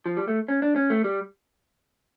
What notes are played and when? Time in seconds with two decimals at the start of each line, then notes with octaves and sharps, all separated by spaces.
0.06 F3
0.17 G3
0.28 A3
0.48 C#4
0.62 D4
0.76 C#4
0.90 A3
1.04 G3